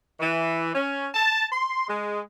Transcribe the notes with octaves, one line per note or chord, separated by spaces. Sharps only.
E3
C#4
A5
C6
G#3